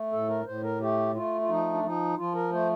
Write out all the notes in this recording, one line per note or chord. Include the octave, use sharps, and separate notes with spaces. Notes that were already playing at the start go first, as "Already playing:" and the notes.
Already playing: A3
A2 A4
A#4
A2 C5
A#4
A3 G4
A3 F4
F4
F3 D#4
D4
F3 D#4
F3 F4
A#4
A3 C5